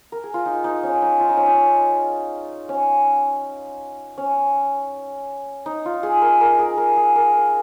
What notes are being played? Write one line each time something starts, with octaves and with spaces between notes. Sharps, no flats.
A#4
G#4
F4
D#4
D#4
C#4
D#4
F4
D#4
C#4
D#4
C#4
C#4
D#4
F4
G#4
A#4
A#4
G#4
A#4
G#4
A#4